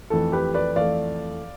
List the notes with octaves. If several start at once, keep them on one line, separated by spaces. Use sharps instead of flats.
F2 E3 A3 A4
G4 B4
B4 D5
F2 E3 A3 D5 F5